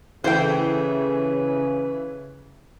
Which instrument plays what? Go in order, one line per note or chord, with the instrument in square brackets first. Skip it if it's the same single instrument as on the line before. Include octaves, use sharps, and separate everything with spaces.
[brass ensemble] C#3 [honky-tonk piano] E3 A3 E4 [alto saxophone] B4 [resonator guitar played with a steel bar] C5 G5